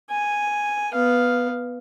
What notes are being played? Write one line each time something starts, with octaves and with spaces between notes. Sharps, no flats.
G#5
B3 F5